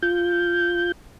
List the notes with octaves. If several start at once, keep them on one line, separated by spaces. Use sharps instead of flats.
F4 G6